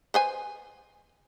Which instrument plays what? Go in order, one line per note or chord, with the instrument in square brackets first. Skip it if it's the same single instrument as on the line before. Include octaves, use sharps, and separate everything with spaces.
[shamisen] B4 C5 G#5